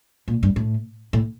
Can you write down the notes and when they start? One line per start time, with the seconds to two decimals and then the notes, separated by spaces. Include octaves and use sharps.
0.28 A#2
0.43 G2
0.56 A2
1.13 A2